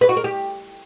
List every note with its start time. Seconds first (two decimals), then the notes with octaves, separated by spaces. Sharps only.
0.01 B4
0.09 F#4
0.17 A#4
0.24 G4